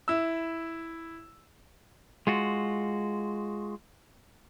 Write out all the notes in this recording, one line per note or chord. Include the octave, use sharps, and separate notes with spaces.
E4 E6
G#3 F4 F#4